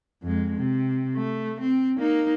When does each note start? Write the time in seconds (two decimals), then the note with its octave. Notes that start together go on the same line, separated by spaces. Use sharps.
0.23 F2 G#3
0.56 C3
1.15 A3
1.60 C4
1.98 A#3 D#4